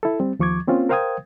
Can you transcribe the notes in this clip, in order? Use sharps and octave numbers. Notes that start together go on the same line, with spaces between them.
E4 A4
G3 C4
D#2 F3 C#6 D6 G#6
A#3 C4 C#4 F4
A#4 C5 F5 G5 D#6 G#6